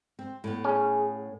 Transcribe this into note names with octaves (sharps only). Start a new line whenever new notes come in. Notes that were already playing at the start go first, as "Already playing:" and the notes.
C4
A2 B3
C#4 G#4